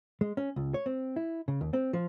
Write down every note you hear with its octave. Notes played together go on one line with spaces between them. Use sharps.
G#3
C#4
C#2
C#5
C4
E4
C#3
D#2
C4
F3